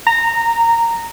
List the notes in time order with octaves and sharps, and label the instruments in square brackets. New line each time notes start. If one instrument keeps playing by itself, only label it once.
[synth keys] A#5